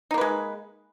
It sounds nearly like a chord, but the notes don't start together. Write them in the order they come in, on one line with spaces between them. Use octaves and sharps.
D#4 A#3 B4 G#3